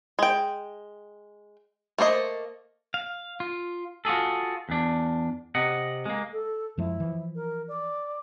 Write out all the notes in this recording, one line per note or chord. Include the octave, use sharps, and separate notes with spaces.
G#3 G5
A3 A#3 C5 D#5
F5
F4
F4 F#4 G#4 A4
E2 D4
C3 D#5 F#5
G#3 A#3
A4
F#2 F3 G#3 E4
E3 F3
A#4
D5